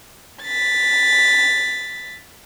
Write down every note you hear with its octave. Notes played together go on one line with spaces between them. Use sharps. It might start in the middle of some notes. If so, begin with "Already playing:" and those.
A6 B6